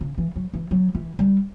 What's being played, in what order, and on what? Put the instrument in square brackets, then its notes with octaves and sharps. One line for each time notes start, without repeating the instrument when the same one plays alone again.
[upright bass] C#3
E3
F#3
E3
F#3
E3
G3